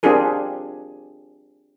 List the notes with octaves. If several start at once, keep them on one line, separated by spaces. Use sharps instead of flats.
C4 D4 F4 G4 G#4 A#4